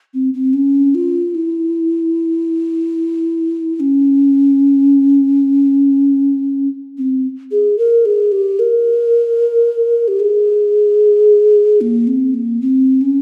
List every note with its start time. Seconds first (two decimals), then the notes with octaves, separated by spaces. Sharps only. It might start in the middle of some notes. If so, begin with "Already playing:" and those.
0.14 C4
0.34 C4
0.53 C#4
0.95 F4
1.35 E4
3.76 E4
3.80 C#4
6.98 C4
7.51 G#4
7.78 A#4
8.05 G#4
8.32 G4
8.59 A#4
10.08 G4
10.20 G#4
11.81 A#3
12.07 C4
12.34 A#3
12.61 C4
13.01 C#4